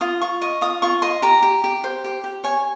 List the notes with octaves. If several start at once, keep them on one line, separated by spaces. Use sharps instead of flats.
F4 D#6
F4 C#6
D#5 C#6
F4 D#6
F4 C#6
D#5 C6
G4 A#5
G4
G4
C5
G4
G4
C#5 G#5